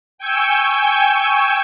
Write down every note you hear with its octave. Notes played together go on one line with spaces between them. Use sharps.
G5 G#5 C#6 E6 G6